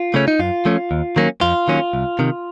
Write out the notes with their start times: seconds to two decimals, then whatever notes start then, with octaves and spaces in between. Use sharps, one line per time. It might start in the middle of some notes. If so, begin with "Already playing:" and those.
Already playing: F4
0.14 C#3 A3 C#4
0.28 D#4
0.39 F#2 F4
0.65 F3 A3 C#4
0.91 D#2
1.16 D#3 F#3 A#3 C#4
1.41 F2 F4
1.68 D#3 F#3 A#3 C#4
1.93 C2
2.19 C3 D#3